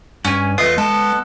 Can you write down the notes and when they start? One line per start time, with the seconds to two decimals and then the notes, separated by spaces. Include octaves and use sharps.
0.25 G2 C#4 G#5
0.58 E2 A3 F4 B4 D#5 E5 D#6
0.78 G#3 B3 A4